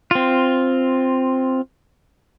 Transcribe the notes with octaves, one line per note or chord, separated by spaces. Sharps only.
C4 F4